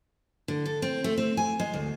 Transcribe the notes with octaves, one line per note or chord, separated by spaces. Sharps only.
D3
A4
C4
A3
C4
G#5
G#3
D2